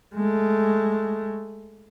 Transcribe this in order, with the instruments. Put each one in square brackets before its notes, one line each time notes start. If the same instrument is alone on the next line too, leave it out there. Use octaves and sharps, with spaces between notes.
[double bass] G#3 A3